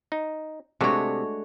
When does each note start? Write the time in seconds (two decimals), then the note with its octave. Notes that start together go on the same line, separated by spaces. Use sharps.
0.12 D#4
0.81 C3 G#3 A3 D4 F#4 C#5